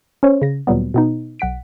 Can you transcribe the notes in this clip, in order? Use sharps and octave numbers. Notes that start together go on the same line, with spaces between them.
C#4 C5 C#5
C#3 A#6
D2 A#2 F#3 G3 B3
B2 B3 D#4
B1 F#5 B6 D7